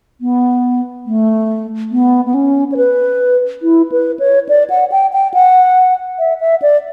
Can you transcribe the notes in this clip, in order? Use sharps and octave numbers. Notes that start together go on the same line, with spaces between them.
B3
A3
B3
B3
C#4
C#5
B4
E4
B4
C#5
D5
F#5
G5
G5
F#5
E5
E5
D5